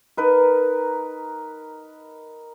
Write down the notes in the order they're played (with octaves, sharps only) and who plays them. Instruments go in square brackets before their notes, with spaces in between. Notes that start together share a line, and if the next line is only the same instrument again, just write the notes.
[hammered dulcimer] D#4 A#4 B4